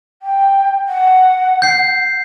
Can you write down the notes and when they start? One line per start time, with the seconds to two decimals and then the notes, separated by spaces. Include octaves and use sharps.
0.22 G5
0.88 F#5
1.62 G6 C7